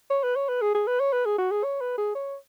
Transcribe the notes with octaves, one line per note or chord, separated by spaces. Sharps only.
C#5
B4
C#5
B4
G#4
G#4
B4
C#5
B4
G#4
F#4
G#4
C#5
B4
G#4
C#5